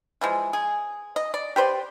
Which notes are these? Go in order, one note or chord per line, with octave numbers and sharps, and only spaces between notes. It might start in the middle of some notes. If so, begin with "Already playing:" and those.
E3 F3 G#3
G#4
D#5
D5
G4 B4 C5 D5